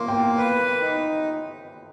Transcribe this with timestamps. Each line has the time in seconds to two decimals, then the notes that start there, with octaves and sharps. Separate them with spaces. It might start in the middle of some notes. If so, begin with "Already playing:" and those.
Already playing: A#3 C6
0.08 G5
0.38 B4
0.81 D#4